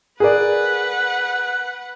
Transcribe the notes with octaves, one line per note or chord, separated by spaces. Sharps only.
G#4 A#4 B4 D5 F#5